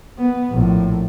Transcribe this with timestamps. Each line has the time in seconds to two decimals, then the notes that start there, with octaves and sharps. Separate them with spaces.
0.18 B3
0.50 A#1 A2